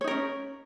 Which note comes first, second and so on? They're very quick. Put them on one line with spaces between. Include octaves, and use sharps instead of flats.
C#5 D#4 A#4 C#4